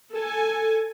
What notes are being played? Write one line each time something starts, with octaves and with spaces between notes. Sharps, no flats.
A4 G#5